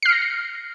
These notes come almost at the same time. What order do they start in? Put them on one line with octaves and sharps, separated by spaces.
C7 F6 C#7 A#6